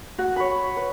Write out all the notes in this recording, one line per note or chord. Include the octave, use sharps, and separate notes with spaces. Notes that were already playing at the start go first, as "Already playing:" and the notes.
F#4
C#5 B5
B4